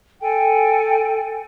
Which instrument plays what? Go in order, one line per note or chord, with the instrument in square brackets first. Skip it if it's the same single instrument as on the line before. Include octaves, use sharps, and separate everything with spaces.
[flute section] A4 G5 G#5